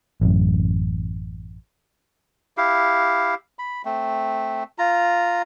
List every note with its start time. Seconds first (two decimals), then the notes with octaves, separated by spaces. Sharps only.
0.21 A1 F#2
2.57 E4 G4 F5
3.59 B5
3.85 A3 C4
4.78 F4 A#5